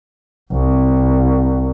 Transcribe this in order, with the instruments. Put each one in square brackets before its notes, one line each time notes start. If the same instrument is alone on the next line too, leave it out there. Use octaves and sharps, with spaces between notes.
[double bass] C2